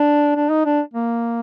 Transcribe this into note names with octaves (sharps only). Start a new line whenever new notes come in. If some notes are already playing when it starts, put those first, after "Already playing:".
Already playing: D4
D4
D#4
D4
A#3